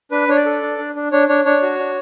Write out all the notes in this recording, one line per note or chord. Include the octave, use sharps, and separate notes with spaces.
D4 B4
D4 C#5
D5
A4
D4
D4
D4
D4 C#5
D4 C#5
D4 C#5
F#4
D4